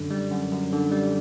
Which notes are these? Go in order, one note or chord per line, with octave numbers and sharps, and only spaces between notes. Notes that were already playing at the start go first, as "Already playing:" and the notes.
Already playing: F#2 D3
G3
F#2
F#2
D3
G3